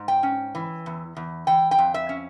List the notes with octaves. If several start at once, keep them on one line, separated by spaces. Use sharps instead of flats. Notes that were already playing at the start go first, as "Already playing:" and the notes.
Already playing: G#2
G5
C#4
E3
E2
E2
E3 G5
G5
F2
E5
C#4